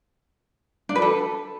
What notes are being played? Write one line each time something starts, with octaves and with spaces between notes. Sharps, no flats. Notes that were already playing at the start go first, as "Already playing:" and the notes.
D4
B4
A4